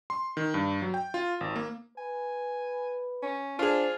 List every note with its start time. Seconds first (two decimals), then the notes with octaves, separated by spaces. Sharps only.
0.10 C6
0.37 D#3
0.54 G2
0.82 F#3
0.94 G5
1.14 F4
1.41 G#1
1.56 A#3
1.98 B4 G#5
3.23 C#4
3.59 D4 F4 G#4 C5